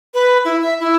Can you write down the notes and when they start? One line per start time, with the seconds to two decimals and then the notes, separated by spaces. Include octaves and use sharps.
0.14 B4
0.45 E4
0.62 E5
0.80 E4